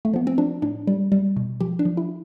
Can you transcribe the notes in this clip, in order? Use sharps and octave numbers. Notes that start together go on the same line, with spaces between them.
A3
F3 B3
C4
F3 D4
A2 D4
G3
G3
B2
F3 G4
D4
F3
E4